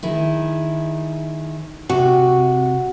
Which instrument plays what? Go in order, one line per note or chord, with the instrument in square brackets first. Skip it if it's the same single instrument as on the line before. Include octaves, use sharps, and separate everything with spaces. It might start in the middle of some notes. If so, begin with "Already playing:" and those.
[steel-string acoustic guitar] D#3 E4 G#4
[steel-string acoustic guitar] C3 [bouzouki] F#4